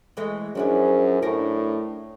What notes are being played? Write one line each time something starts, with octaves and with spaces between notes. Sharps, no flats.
E3 G#3 A3
F#2 F3 C#4 D4 E4 G#4
A2 A3 D4 A#4